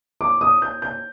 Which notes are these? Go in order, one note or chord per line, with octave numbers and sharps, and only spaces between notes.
D6
D#6
G6
G6